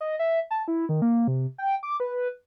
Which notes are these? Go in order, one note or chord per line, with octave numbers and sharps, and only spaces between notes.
D#5
E5
A5
E4
D#3
A#3
C3
G5
D6
B4